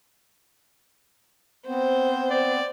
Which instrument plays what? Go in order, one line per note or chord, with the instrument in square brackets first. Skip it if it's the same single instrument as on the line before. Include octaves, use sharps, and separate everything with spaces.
[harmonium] B3 C4 [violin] C5
[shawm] D5